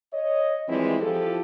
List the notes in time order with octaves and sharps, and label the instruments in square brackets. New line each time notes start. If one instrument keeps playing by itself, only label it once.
[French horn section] C#5 D#5
E3 F3 G3 G#3 C4 E4
F3 E4 F4 G4 A4